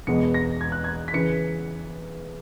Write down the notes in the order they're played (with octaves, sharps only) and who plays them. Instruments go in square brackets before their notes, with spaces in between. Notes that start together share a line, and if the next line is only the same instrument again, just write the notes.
[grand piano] E1 E2 B2 G#3 B3 C#7
A#6
G#6
F#6
G#6
B6
C#3 E3 C#7